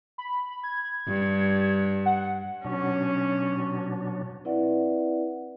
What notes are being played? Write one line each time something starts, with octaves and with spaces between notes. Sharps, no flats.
B5
G#6
G2
F#5
B2 F#3 C#4 D4
C4 E4 B4 D5 E5 F#5